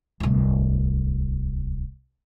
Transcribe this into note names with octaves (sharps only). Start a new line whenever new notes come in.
D1 C2